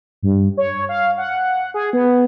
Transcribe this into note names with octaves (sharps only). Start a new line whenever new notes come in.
G2
C#5
F5
F#5
G#4
B3